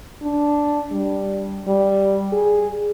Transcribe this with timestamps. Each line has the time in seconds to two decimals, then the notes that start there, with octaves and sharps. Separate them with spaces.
0.22 D4
0.92 G3
1.67 G3
2.33 G#4